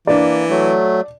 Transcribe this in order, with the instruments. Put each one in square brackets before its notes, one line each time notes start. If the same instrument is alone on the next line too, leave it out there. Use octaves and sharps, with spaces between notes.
[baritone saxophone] E3 [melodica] A#3 [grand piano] D4 D5
[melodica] F#3 A3